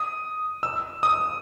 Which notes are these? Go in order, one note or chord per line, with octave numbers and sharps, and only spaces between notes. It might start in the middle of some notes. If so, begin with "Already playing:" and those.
Already playing: D#6
E6
D#6